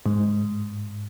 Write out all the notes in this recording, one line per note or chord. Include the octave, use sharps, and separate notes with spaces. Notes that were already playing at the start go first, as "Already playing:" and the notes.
G#2